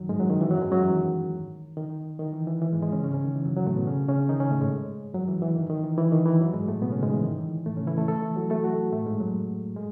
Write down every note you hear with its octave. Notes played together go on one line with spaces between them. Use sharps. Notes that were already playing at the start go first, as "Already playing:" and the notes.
Already playing: F#2 D#3 F#3
G#2 G#3
F#2 F#3
D#3
E3
F#2 F#3
G#2 G#3
F#2 F#3
E3
D#3
D#3
D#3
E3
E3
E3
G#2 G#3
G#2 G#3
C#3 C#4
C#3 C#4
C#3 C#4
D#3
E3
F#2 F#3
F#2 F#3
A2 A3
B2 B3
C#3 C#4
C#3 C#4
D#3 D#4
C#3 C#4
A2 A3
G#2 G#3
F#2 F#3
E3
E3
D#3
D#3
E3
E3
D#3
E3
F#2 F#3
G#2 G#3
A2 A3
B2 B3
C#3 C#4
G#2 G#3
E3
D#3
E3
A2 A3
C#3 C#4
E3 E4
A3 A4
A3 A4
E3 E4
F#3 F#4
A3 A4
F#3 F#4
A2 A3
G#2 G#3
F#2 F#3
G#3